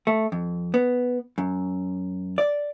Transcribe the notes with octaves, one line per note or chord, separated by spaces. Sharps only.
A3
F2
B3
F#2
D5